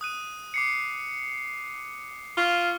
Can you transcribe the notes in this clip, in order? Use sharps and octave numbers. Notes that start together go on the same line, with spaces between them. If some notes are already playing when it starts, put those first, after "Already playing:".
D#6 F#6 D#7
D6 C7 C#7
F4 C#6 F6 G7